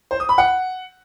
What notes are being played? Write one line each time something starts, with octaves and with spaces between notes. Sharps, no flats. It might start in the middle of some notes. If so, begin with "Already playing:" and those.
C5
D#6
B5
F#5